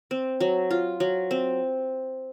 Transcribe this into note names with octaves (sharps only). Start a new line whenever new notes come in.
C4
F#3
F4
F#3
C4